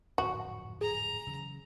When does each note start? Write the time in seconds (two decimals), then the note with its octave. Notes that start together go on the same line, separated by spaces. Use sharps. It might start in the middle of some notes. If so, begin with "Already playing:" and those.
0.18 D1 F2 G#2 F#4
0.81 G#4 A#5
1.27 C#3 E3 F#3